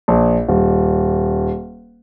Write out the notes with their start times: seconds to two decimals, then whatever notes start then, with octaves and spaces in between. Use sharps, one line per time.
0.08 A#1
0.49 D#1